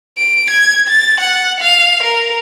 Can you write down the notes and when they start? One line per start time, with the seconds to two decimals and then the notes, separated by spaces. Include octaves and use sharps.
0.18 D7
0.51 G#6
0.89 A6
1.21 F#5
1.61 F5
2.04 A#4